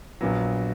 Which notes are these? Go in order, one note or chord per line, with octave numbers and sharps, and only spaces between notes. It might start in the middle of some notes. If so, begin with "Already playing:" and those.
A#1 A#2 F#3 B3